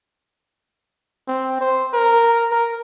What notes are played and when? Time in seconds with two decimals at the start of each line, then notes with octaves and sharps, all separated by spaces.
1.27 C4
1.61 C5
1.93 A#4
2.51 A#4